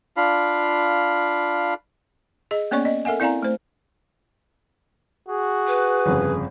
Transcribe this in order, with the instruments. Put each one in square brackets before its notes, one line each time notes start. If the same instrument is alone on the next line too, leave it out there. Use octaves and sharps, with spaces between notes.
[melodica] D4 F4 F5 B5
[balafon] G#4 D#5
A#3 B3 C#4 C#5 D5 C#6
D5 D#5
A4 A#4 E5 F#5 G#5
C4 E4 D5 F5 G#5 A#5
A3 C5
[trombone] F#4 [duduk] G#4
[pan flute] B4
[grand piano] G1 F2 C#3